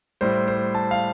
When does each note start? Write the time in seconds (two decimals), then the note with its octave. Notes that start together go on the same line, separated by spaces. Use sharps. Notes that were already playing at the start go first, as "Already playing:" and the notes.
0.21 A2 G3 C5
0.48 C5
0.75 A5
0.91 F5